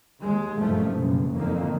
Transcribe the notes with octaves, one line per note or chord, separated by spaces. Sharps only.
D#2 G#3
F#1 G2 A#2 D#3 F3 A3
F#1 C#2 B2
F2 A2 D3 D#3 A#3